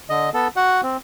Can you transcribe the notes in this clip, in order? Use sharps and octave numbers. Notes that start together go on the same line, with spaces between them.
D3 D#5
B3 A4
F#4 F#5
C4